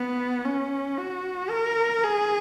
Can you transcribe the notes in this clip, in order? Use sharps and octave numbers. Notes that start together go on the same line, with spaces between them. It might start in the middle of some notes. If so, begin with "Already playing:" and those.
Already playing: B3
C#4
F#4
A#4
G#4